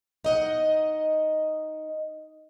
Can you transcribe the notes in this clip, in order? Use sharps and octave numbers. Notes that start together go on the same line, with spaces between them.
D#4 D#5 F#5